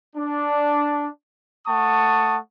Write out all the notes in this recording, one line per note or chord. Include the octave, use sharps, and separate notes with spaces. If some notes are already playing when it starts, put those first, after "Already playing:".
D4
A3 F#5 A5 C#6 D#6